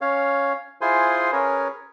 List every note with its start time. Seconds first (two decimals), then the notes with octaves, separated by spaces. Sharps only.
0.01 C#4 C#5 F5
0.81 E4 F4 G#4 C5 G#5 C6
1.32 C#4 G#4 A#4 B4 C#5